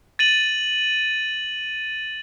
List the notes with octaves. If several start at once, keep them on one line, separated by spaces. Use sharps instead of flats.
A6 D#7 F#7